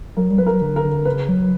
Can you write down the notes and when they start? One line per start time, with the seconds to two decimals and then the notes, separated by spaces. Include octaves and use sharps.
0.17 F#3 A#4
0.30 G3
0.38 F#3 B4
0.46 A#4
0.62 D3
0.76 A#4
0.84 D3
1.05 C#3 B4
1.29 F#3